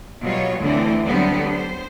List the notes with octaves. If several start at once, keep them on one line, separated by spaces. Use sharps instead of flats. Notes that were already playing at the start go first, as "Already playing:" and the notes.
B2 F#3 G3 F4 C#5
D2 D3 E3 A3 C4
D3 F#3 G3 B3 C4
C5